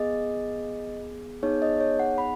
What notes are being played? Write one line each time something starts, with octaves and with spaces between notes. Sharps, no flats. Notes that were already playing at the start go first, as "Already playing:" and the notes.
Already playing: B3 G#4 D#5
B3 D#4 G#4 C#5
D#5
C#5
F#5
B5